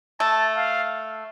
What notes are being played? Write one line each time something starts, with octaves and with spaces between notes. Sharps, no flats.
A3 A5
F5